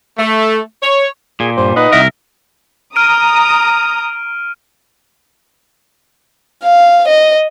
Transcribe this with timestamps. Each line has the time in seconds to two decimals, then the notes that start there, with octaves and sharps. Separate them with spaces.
0.18 A3
0.82 C#5
1.40 A#2 G#4
1.57 G2 C5
1.76 D#4 B4 D#5 F#5
1.93 C2 A#4 E5
2.96 A#5 D#6 F6 D7 D#7
6.63 F5
7.08 D#5